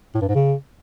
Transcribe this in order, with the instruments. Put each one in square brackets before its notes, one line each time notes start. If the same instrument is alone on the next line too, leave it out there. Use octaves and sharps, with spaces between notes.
[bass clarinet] A2
G2
G#2
C#3